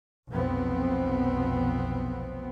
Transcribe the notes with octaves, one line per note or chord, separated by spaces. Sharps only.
F1 B1 F3 B3 C4